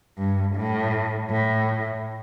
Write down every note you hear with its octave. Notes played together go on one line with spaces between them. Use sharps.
G2
A2
A2